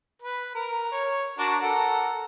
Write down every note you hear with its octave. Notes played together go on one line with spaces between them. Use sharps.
B4
A#4
C#5
D4 F#4 A#4
A4 A#4 F#5